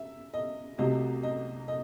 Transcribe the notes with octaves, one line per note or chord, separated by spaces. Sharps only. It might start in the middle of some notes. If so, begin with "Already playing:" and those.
Already playing: E5
D#5
C2 C3 F#3 A3 D#5
D#5
D#5